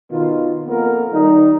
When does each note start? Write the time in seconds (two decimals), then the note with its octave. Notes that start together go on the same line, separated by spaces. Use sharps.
0.10 B2 D#3 F4
0.66 F2 A#3 B3 A#4
1.13 D#3 G3 D#4